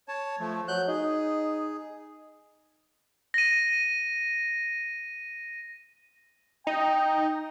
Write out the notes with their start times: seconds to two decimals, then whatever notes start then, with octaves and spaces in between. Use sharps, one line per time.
0.08 C#5 A5
0.40 F3 A3
0.68 F#3 F#6 G6
0.88 D#4 G#4
3.34 A#6 D#7
6.67 D#4 G5